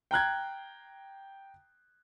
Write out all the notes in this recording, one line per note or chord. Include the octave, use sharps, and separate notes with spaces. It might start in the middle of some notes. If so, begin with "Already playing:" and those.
G5 A#5 F#6 G#6